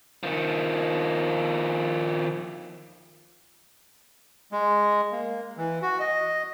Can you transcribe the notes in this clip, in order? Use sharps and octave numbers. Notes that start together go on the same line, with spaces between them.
D#3 F3
G#3
A#3
E3
F#4
D#5